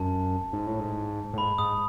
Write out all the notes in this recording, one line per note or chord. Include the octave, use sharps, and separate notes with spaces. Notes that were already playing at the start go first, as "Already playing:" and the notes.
Already playing: F#2 A5
G#2
A2
G#2
A2
G#2 B5
G#2 D#6